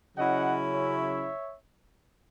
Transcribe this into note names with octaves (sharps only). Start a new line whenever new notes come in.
C#3 F#3 C#4 E4 D#5 F#5
C#5 E5